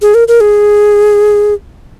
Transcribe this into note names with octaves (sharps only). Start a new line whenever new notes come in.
G#4
A#4
A#4
G#4